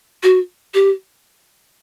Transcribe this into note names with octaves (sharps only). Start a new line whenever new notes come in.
F#4
G4